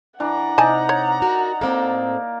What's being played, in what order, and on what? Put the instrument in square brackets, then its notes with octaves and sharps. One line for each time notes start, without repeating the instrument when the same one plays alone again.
[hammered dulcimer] E3 D4 [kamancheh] F#5 A#5
[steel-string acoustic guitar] C3 [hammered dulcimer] D#4 D5 [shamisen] G#5 A5
[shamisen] C#5
[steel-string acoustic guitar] F#4 A#4
[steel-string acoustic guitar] A2 C4 A4 [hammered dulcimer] A#3